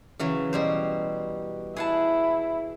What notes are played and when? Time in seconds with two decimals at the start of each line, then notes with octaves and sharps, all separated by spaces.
0.19 C#3 E3 F#3
0.53 B2 G3 C5
1.76 E4 G#4 F#5 A5